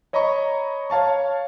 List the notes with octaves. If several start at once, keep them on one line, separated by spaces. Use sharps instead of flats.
C#5 D#5 A#5 B5 C#6
C#5 F5 A5 C#6